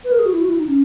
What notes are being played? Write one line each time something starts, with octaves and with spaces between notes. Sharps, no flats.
B4
A#4
G#4
F#4
E4
F#4
E4
D#4
C#4